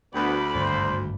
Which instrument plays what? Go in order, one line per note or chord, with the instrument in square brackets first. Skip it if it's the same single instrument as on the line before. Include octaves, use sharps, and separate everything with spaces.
[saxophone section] D2 [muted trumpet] B3 [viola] D5 B5
[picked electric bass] G#1 G2 D3 [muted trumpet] C5